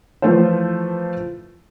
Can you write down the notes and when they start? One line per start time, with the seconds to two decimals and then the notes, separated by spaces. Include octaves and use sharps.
0.22 E3 F3 A3 F4 C5